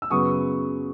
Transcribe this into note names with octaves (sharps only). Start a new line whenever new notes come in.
E6
F#2 C#3 F#3 B3 C#6 D#6